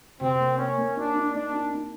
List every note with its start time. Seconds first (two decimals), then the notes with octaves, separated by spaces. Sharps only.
0.21 C3 C4
0.40 A#3
0.58 A#3 C#4
0.78 A#3
0.96 D4 D#4
1.15 D#4
1.35 A#3 D4
1.53 D#4
1.72 D#4